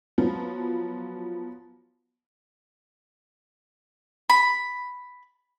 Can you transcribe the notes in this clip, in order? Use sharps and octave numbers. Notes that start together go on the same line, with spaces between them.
F3 F#3 B3
B5